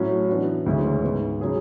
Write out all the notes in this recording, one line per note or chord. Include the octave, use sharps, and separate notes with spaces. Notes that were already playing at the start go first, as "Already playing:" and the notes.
Already playing: A2 F#3 C#4 F#4
E3 B3 D4 F#4
D2 C#3 E3 G#3 C#4
G#2 G#3 B3
C#3 F#3 C#4 G#4